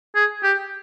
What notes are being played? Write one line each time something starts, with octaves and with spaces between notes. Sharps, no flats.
G#4
G4